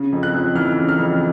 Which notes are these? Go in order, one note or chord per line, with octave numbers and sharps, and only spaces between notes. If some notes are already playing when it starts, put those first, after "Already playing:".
Already playing: C#3
F2
F#6
F2
E3 F6
C#3
F6
F2